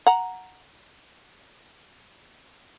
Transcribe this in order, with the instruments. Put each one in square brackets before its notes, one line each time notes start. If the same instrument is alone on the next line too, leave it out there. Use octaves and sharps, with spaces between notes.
[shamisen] F#5 A#5